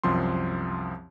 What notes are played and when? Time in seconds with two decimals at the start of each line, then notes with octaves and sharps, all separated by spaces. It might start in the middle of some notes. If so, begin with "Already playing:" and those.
0.04 C2 F#2 F3 C4 C6